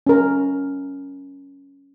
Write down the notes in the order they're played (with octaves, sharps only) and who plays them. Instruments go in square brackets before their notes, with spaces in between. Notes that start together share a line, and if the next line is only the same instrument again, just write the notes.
[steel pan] C#4 A#4